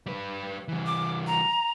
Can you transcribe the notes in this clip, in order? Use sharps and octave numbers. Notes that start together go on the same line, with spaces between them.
G3 B4
E3 G3
D6
A#5